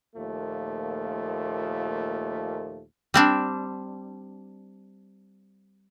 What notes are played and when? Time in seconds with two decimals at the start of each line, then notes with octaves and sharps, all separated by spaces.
0.16 D#2 A#2 F3 A3
3.14 G3 C4 D4